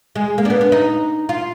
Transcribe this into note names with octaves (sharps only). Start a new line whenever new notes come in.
G#3
A#3
D4
B3
B3
D#4
F4